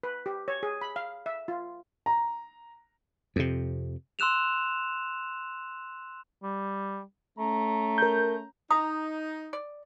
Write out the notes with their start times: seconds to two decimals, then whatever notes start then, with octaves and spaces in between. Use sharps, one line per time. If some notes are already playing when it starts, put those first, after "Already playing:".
0.03 B4
0.26 G4
0.48 C#5
0.63 G#4
0.81 B5
0.96 F5
1.26 E5
1.48 F4
2.06 A#5
3.36 F2 C3
4.19 C6 E6 F#6 E7 F7
6.43 G3
7.38 A3 C#4 A#5
7.98 A#4 G6
8.70 D#4 A#5 D#6
9.53 D5